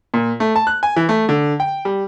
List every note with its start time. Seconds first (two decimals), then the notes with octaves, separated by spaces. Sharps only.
0.14 A#2
0.40 A3
0.56 A5
0.67 F#6
0.83 G#5
0.96 E3
1.09 A3
1.29 D3
1.60 G5
1.85 G3